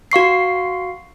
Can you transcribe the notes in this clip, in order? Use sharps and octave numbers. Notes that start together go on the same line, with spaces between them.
F#4 F5 C#6 C7